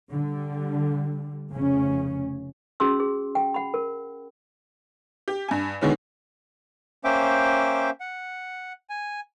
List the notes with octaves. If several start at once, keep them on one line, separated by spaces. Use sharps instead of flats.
D3 G3
F1 C#3 C#4
C#4 F#4 G#4 C6 E6
G#4
G5
F#5 B5
A#4
G4
G2 G#5
B2 D3 D#3 G#3 B3 C#4
A#3 C#4 C5 E5 G5 D6
F#5
G#5